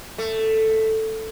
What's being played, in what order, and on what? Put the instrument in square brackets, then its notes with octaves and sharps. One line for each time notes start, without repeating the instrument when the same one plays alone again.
[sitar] A3